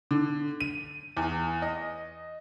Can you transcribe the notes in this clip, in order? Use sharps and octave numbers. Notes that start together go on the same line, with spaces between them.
D3
D#7
E2
D#5